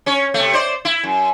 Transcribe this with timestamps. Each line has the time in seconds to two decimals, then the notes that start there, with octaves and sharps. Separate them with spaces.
0.06 C#4 C#5
0.34 C3 A3
0.53 C5 D5
0.85 E4
1.03 F#2